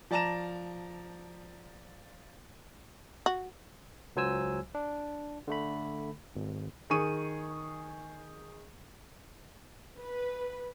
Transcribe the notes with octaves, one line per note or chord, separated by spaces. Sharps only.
F3 D5 A5 A#5 A#6 E7
F#4
C#2 F#3 C5 G#5 E6
D4
D3 A3 B5
G#1
D#3 G#4 C#6 D#7
B4